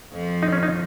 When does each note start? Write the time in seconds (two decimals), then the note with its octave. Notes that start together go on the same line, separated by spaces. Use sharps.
0.13 F2 F3
0.43 D#4
0.52 C#4
0.63 D#4